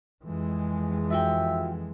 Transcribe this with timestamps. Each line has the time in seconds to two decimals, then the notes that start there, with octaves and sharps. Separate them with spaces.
0.24 F2 E3 G#3
1.10 F4 F#4 E5 G5